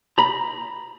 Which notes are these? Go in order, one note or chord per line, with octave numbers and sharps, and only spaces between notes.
A#5 B5